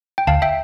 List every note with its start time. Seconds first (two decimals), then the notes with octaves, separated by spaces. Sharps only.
0.18 G5
0.27 D2 F5 A5
0.42 E5 G5